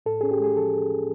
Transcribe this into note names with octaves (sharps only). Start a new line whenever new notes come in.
A2 A4
C#4 G#4
G4
G#3 G#4
F3 A4